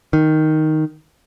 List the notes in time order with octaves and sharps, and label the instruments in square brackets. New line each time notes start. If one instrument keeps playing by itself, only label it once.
[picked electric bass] D#3